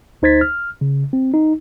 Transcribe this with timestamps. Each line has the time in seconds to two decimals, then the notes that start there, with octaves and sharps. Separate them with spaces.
0.22 D2 D#4 C5 G#6 A6 B6
0.41 F6
0.81 C#3
1.13 C4
1.34 D#4